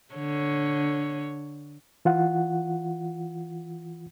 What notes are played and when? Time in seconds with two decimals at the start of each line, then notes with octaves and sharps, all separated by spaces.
0.14 D3 C#5
2.05 E3 F4 F#5